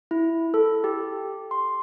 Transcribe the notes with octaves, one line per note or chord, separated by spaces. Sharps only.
E4
A4
G4
C6